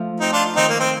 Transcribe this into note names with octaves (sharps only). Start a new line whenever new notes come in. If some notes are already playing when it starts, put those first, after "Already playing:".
Already playing: F3 A3
C4 D#4
D4 F4
D#3 C4 D#4
A#3
C4